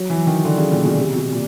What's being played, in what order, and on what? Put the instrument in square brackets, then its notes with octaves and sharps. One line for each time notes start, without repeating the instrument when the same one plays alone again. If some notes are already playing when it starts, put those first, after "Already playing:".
Already playing: [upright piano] F#3
E3
D#3
D3
C#3
A#2
B2
C3
B2
A#2